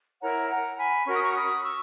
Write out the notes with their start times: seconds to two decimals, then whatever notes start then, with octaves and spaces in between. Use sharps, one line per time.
0.21 E4 A#4 C#5 F#5 A#5
0.49 F#5 A#5
0.77 G#5 B5
1.06 C#4 F#4 A#4 C#6
1.15 D#6
1.23 A#5 C#6
1.35 B5 D#6
1.63 C#6 E6